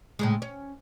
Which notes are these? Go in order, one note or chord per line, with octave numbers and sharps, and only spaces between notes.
A2 C#3 G#3
C#4